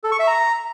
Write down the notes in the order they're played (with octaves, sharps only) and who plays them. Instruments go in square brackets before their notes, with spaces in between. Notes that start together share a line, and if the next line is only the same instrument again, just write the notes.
[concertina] A4
C#6
E5
A#5